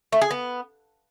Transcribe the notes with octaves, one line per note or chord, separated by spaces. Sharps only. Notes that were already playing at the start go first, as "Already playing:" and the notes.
A3
G#4
B3